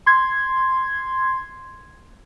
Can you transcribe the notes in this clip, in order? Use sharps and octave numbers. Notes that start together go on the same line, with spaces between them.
C6 G#6